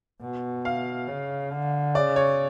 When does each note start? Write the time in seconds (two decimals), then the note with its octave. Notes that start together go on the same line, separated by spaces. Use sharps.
0.21 B2
0.65 F5
1.08 C#3
1.52 D3
1.95 C#3 D5
2.16 C#5